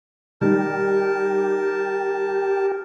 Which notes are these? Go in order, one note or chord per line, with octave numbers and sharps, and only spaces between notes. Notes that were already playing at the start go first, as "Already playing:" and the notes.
D#3 G3 G4 A#4 A5